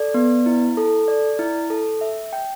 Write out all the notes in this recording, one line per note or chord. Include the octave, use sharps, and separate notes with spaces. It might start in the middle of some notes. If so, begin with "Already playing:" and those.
Already playing: A4 D5
B3
E4
A4
D5
E4
A4
E5
G5